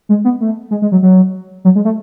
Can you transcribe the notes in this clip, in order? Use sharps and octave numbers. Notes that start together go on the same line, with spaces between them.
G#3
B3
A3
G#3
G#3
F#3
F#3
F#3
G#3
A3